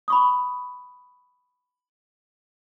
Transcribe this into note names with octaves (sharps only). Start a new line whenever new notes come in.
B5 C#6 D#6